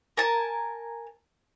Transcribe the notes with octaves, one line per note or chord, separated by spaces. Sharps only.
A#4 G#5 A5